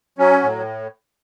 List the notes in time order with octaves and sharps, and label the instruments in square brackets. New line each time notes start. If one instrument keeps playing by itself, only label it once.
[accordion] F#3 C#4
A2